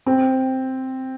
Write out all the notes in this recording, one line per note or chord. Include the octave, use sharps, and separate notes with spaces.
C4